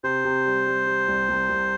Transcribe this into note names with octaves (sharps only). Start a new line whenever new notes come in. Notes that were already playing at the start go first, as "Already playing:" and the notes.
C3 C5
C3
G3
G3
G3
C2
C2
C2